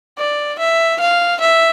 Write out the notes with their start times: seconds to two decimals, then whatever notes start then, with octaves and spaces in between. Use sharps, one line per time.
0.18 D5
0.59 E5
1.00 F5
1.40 E5